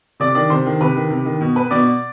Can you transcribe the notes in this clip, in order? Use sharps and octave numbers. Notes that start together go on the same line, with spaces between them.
C3 D5 D6
D#3 D5 D6
C3 C5 C6
D#3
C3 B4 B5
D#3
C3
D#3
B2
B4 B5
B2 D5 D6